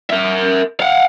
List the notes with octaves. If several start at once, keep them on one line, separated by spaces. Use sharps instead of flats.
A#4 E5
F5 F#5